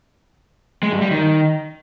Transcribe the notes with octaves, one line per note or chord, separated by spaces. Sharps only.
G#3
G2
G3
D#3